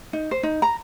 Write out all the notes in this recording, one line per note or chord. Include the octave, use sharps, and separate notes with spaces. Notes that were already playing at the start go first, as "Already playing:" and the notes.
D#4
C5
D#4
A#5